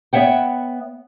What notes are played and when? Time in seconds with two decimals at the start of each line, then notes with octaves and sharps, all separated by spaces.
0.13 B3 C#5 E5 F#5 G5